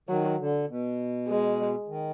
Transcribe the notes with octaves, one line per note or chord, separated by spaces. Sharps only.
D#3 F#3
D3
B2
G#3
D#3